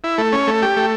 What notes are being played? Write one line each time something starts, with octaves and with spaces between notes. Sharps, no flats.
E4
A3
C#4
A3
G4
A3